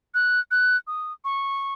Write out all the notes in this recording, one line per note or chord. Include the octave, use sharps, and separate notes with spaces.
F#6
F#6
D#6
C#6